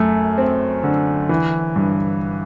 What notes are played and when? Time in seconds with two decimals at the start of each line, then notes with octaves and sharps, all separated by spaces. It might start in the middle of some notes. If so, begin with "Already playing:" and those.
Already playing: F#2 A3
0.38 C4
0.83 D3
1.29 E3
1.76 G2